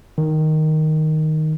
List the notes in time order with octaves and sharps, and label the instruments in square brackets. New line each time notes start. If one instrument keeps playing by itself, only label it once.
[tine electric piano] D#3